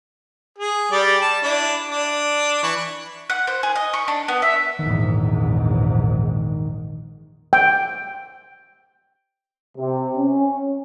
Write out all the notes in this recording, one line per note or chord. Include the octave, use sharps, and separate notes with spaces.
G#4
G3 G4 D5
A5
D4 E4
D4
E3 C#6
F#5
C5
G#4
D#5
C#6
D4
B3
E5
A#1 E2 G#2 D#3
G5
C3
C#4